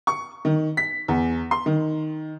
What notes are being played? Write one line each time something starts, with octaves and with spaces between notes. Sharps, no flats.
C#6
D#3
B6
E2
C6
D#3